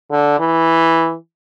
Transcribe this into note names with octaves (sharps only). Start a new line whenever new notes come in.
D3
E3